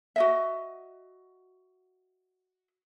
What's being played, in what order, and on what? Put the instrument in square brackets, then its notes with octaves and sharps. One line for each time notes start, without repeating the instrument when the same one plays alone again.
[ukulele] F#4 D#5 E5